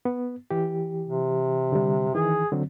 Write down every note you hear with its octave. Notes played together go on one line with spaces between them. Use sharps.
B3
E3 G4
C3
D3 G3
D#3 E3 G#4
D3 F#3 C4